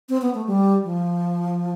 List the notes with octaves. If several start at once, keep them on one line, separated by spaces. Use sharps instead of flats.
C4
B3
A3
G3
F3